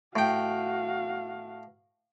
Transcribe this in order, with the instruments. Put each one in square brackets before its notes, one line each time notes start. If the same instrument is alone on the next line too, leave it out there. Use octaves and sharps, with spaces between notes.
[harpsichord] A2 G5 [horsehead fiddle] F#4 F5